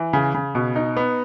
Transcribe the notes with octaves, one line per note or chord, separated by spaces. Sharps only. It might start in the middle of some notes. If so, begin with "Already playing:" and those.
Already playing: E3
C#3
C#3
B2
D#4
B3